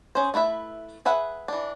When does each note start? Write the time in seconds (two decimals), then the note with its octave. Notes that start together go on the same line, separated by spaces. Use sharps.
0.15 C#4 G#4 C5
0.34 A3 E4 B4 E5
1.05 G#4 B4 E5 F#5
1.48 E3 D4